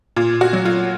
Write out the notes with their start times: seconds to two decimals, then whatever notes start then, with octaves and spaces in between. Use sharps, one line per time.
0.16 A#2 F4
0.41 F#4
0.53 F#3
0.65 F4